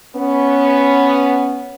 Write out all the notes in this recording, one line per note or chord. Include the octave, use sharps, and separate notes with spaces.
B3 C#4